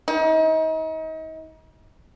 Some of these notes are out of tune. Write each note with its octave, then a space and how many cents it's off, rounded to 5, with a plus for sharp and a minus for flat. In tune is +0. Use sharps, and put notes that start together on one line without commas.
D#4 +35